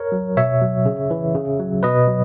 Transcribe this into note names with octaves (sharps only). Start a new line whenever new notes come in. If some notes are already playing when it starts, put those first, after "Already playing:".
Already playing: A#4 C#5
F#3
B2 C#5 E5
F#3
C#3
E3
C#3
F#3
B2 B4 D#5
F#3